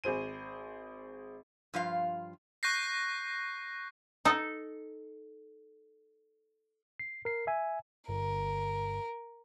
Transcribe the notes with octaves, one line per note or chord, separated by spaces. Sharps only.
G#1 G#4 C5 D#7
G2 F3 F4 F5
C#6 F#6 G6 A#6 C7
D#4 A4
C7
A#4 C7
E5 G#5
G1 A#4